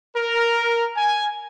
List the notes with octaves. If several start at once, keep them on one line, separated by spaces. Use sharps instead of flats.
A#4
G#5